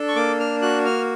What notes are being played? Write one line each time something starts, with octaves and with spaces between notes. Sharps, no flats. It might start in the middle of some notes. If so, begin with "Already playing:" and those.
Already playing: D4 A4
C#6
A#3 D6
F6
F#4 F#6
F6